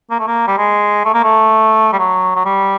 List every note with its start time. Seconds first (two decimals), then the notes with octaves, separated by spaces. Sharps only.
0.11 A#3
0.19 A3
0.27 A#3
0.47 G3
0.58 G#3
1.05 A3
1.14 A#3
1.24 A3
1.93 G3
1.99 F#3
2.36 F#3
2.46 G3